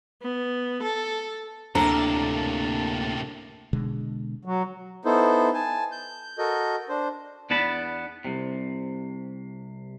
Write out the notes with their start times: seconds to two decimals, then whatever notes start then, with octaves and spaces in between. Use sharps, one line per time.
0.22 B3
0.83 A4
1.75 D2 A2 C3 A#3 D4 A4 A5 A#5
3.73 B2 D3 G#3
4.45 F#3
5.05 B3 D#4 E4 A4 C5
5.54 G#5 A5
5.92 G6
6.38 F#4 A4 A#4 D#5 G6
6.89 D4 C5
7.50 E2 B3 D4 A5 B5
8.25 C2 C3